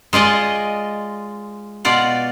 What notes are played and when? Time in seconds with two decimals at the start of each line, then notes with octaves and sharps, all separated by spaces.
0.13 G#3 F4 D5 D#5
1.85 B2 F4 D5 F#5